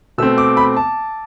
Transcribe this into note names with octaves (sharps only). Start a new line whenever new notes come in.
B2 A3 C4 E6
D6
B5
A5